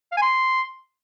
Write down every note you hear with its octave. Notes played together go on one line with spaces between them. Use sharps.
F5
G#5
C6